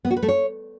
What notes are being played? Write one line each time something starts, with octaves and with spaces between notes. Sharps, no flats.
B3
F#4
B4
A3
C#5